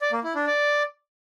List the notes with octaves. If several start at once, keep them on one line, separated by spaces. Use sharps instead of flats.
D5
A#3
E4
D4
D5